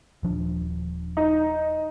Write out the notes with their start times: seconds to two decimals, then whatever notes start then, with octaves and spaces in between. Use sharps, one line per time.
0.23 D#1 F3 D4
1.17 D#4